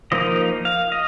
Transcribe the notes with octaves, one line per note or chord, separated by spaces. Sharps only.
F3 A#3 D#4 D#5
F5
D#5